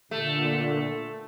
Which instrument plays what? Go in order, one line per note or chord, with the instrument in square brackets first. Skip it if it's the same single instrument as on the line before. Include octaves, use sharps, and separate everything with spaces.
[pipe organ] A#2 D3 [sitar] A3